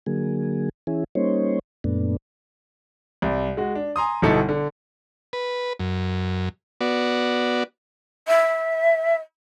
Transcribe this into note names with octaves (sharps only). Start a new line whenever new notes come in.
D3 F#3 A#3 G#4
E3 C#4 E4 G#4
G3 A#3 C#4 D#4 C5 C#5
F#2 A#2 A3 B3 D4
C2 D5
G#3 F#4
D4
G#5 A#5 C6 D#6
G1 B2 D#4 E4 A4 C#7
D3
B4
F#2
B3 F#4 D5
E5